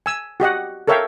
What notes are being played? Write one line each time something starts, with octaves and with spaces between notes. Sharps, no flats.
G#5 E6
F#4 G4 D#5 F#5
A4 A#4 C#5 E5 F5 G5